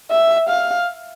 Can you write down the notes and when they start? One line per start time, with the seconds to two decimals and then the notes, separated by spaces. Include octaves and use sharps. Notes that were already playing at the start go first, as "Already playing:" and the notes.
0.11 E5
0.49 F5